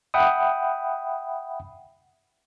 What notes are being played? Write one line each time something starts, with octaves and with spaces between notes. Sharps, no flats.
E5 F#5 G5 B5 D#6